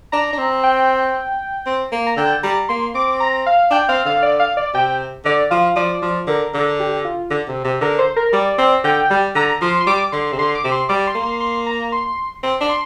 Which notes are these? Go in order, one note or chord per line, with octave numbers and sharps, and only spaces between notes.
D4 A#5
D4
C4
G5
C4
A#3
A#5
D3 G5
G3 A#5
A#3 C6
C4 D6
A#5
F5
D4 G5
C4 F5
D3 F5
D5
F5
D5
C3 G5
D3 D5
F3 F5
F3 D5
F3
D3 A#4
D3
G4
F4
D3
C3
C3
D3 A#4
C5
A#4
G3 D5
C4
D3 G5
G3
D3 A#5
F3 C6
C6
G3 D6
D3 C6
C3
D3 C6
D6
C3
C6
G3 D6
C6
A#3
C6
C6
A#5
C6
C4
D4
C6